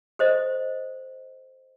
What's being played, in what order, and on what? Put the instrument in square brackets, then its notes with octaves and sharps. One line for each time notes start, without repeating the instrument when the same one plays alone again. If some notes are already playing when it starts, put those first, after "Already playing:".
[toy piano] A4 C5 D#5